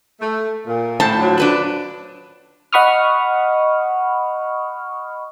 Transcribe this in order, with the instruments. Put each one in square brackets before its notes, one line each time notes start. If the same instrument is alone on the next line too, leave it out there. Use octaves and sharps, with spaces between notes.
[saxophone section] A3
A#2
[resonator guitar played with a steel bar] A2 C5 A5
[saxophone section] D3 F3 F#3
[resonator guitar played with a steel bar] D4 B4 A5
[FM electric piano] D#5 F#5 B5 C#6 D#6 F6